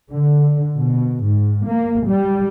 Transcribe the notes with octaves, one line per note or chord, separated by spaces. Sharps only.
D3
B2
G#2
A#3
G3